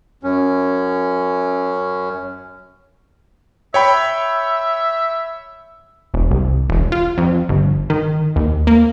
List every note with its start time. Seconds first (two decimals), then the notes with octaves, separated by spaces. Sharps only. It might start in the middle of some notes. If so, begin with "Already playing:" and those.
0.23 F#2 C#4
3.74 C#5 E5 G5 B5
6.14 E1
6.31 C2
6.70 E1
6.92 F4
7.18 F2
7.49 G1
7.90 D#3
8.36 D#2
8.67 A#3